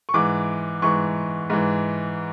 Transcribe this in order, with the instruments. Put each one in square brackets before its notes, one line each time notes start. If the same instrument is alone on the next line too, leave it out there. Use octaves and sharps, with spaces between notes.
[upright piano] C#6
G#2 E3 D6
G#2 E3 C#6
G#2 E3